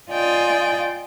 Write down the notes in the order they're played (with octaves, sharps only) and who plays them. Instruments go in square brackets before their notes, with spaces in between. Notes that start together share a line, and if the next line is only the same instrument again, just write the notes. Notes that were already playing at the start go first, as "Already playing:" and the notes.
[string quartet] F4 D5 D#5 G5 G#5